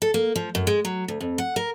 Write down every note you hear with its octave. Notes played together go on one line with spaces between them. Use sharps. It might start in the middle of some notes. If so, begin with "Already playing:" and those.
A4
A#3
F3
F#2
G#3
F#3
D2
F2
F#5
A#4